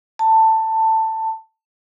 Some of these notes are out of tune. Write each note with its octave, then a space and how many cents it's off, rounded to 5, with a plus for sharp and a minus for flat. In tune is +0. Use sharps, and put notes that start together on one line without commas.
A5 +15